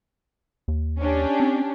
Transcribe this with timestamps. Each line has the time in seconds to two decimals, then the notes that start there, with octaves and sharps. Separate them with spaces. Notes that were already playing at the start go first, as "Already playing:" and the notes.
0.68 D#2
1.01 C#4 D4 G4
1.40 C4